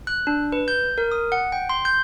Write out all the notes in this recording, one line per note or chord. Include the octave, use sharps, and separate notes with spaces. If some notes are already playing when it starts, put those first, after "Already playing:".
F#6
D4
B4
G6
A#4
D#6
F#5
G5
C6
G6